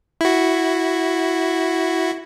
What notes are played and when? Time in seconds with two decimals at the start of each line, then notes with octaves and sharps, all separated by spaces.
0.21 E4 F#4